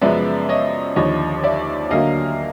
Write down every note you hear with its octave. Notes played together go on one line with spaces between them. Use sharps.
F#2 C#3 F3 G#3 B3 D5 E5
C#5 D#5
D#2 D3 F3 C#5 D#5
D5 E5
D2 D3 F#3 A#3 D#5 F5